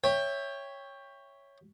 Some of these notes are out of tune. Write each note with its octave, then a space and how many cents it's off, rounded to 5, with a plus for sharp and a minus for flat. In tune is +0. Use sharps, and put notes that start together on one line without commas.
C#5 +0 E5 +0 G5 +20